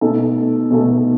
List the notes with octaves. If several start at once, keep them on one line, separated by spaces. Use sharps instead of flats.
B2 A3 D#4 A4
B2 A3 D#4 A4